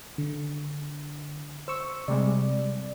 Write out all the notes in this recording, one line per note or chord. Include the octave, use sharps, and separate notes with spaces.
D3
C5 C#6 E6
C3 G3 G#3 D5